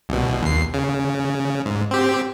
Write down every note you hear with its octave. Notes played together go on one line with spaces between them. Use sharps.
C2 B2
D#2 C7
C#3
G#2
C4 G4